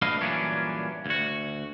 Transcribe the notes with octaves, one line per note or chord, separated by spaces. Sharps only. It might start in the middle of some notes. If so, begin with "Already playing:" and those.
A3 D4 F#4 B4 D#5 F5
G2 A#2 E3 F#3 C#4 D4
D2 F#4